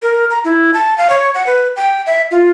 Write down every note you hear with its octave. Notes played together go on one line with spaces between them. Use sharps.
A#4
A#5
E4
A5
F5
C#5
F#5
B4
G5
E5
F4